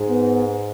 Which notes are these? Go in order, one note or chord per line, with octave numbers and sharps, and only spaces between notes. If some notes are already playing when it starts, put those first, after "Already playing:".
Already playing: G#2
B3